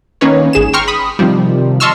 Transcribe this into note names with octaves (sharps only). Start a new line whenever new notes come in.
D#3 A#3 C#4 D#4 B4 C#5
G#1 G#4 E7
G5 A#5 C6 C#6 F6
B5 D#6
C3 D#3 F3 G3
D#5 A5 C6 C#6 E6 F6